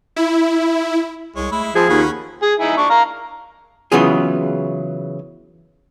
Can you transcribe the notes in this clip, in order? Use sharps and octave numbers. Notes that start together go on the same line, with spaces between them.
E4
C2 G#3 C#5
G#3 A3 E4 B5
F3 C4 F4 G#4
D#2 C#4 F#5 B5
G#4
D#4 E4 G#5
D4 C#6
F5 A#5
C#3 E3 F#3 B3 F4 G#4